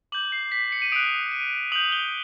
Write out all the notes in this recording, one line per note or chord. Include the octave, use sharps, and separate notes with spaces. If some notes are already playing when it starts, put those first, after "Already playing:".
D6 G6 F#7
C7
B6
C#7
D#7
D#6 F#6 D7
D#7
D#6 G6 F#7
G7